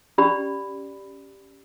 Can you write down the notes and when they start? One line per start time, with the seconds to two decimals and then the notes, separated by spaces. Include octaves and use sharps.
0.18 C#4 G4 D5 B5